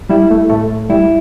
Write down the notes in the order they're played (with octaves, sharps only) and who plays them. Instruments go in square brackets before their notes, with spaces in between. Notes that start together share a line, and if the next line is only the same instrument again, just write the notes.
[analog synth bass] G3 [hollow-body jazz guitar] E4
[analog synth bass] A3
[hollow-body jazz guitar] A2 [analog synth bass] A3
[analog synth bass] G3 [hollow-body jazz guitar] E4